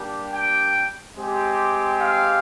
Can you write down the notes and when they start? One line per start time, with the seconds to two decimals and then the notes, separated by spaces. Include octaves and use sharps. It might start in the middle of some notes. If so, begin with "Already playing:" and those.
Already playing: G3 A#3 D4 G4
0.32 G5
1.17 G#3 C4 G4
2.00 F5